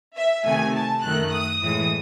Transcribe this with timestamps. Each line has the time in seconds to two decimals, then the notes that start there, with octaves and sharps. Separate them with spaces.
0.16 E5
0.44 C3 D#3 A3 G#5
0.74 A5
1.03 F#2 D#3 A3 F#6
1.32 D#6
1.61 A2 E3 G#3 D#6